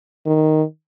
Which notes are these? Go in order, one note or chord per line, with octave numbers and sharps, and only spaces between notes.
D#3